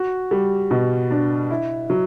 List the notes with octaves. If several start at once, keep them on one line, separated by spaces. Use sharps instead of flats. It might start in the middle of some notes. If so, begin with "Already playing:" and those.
Already playing: F#4
G3
B2
D4
E4
F#3